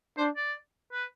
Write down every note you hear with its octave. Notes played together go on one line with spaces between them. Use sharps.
D4 C5
D5
B4